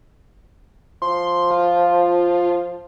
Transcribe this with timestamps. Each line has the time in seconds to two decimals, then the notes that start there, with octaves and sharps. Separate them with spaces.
1.02 F3 C6
1.51 F4